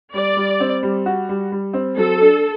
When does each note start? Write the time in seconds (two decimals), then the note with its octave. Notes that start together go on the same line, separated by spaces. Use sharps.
0.14 G3 D5
0.37 G3
0.60 C4
0.83 G3
1.06 F#4
1.29 G3
1.52 G3
1.73 C4
1.96 F#3 A4
2.20 D4